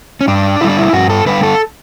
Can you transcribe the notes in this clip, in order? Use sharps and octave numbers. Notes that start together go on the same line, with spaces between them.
C#4
G2 D4
D3 G3 E4
D4
E4
G2 F#4
A4
D3 G3 B4
A4